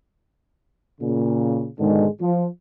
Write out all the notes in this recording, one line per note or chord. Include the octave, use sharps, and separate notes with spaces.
A#2 C#3
G#2 B2 D3 D#3 G#3
F3